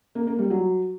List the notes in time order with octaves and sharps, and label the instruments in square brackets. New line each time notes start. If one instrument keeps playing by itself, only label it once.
[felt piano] A#3
A#3
G3
F#3